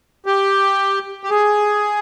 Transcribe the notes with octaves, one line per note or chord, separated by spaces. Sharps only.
G4
G4
G#4